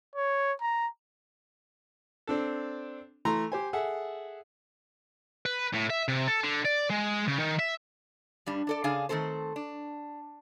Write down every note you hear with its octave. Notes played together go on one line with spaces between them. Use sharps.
C#5
A#5
C4 D4 A4
E3 A3 A#5 C6
G4 C5 G#5
G#4 A4 E5 F#5
B4
A2
E5
C3
A4
D3
D5
G#3
C#3
D#3
E5
G2 G3 D4
D4 A4 D5
C#3 D4 G#4 D5 F5 G#5
D#3 A3 C4 A4 C5
D4